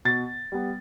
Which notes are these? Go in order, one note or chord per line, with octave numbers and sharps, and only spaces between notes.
B2 A6
G3 B3